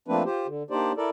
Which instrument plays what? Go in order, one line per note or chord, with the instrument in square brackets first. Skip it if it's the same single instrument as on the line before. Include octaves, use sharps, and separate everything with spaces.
[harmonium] F3 A3 A#3 C4 D4 B4
F4 G4 C5
D3
A#3 D4 D#4 G4 C5 D5
E4 A4 A#4 D5